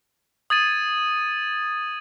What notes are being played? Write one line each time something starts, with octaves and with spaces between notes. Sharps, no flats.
D#6 G#6 A6 D#7